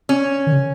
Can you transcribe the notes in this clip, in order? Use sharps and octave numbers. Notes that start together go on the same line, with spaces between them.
C#4
D#3
C#3